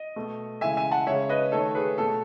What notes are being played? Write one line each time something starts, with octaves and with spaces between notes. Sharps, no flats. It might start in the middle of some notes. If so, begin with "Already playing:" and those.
Already playing: D#5
B2 A3
C#3 E3 G#3 E5 G#5
E5 G#5
F#5 A5
C#3 G#3 C#5 E5
B4 D#5
D#3 A3 A4 C#5
G#4 B4
B2 A3 A4